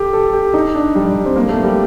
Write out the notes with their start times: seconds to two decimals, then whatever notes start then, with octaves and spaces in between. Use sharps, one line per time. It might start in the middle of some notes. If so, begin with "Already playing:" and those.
Already playing: G4 A4
0.13 A4
0.33 G4
0.54 D#4
0.75 D4
0.95 G3
1.05 G3
1.25 C4
1.36 A#3
1.49 A3
1.63 G3